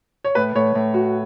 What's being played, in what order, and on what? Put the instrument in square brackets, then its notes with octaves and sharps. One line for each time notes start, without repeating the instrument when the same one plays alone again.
[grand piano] C#5
[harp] A2 [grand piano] B4
[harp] A2 [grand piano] C#5
[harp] A2
F#4